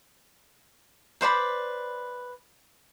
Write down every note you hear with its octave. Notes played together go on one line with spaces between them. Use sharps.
B4 C5 D5 B5